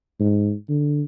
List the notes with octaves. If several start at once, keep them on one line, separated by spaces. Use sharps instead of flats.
G#2
D3